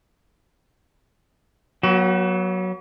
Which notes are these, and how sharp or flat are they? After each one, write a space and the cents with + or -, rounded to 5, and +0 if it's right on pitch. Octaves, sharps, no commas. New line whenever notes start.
F#3 +0 B3 -40 F#4 +35